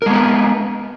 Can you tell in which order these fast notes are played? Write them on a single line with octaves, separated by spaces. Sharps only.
A#4 G#3 B3 B4